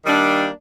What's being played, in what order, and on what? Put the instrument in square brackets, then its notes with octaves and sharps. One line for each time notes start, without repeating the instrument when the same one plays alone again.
[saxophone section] D#3 G3 A#3 D4